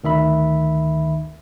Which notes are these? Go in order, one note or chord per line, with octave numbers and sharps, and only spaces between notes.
D2 D#3 E5 B5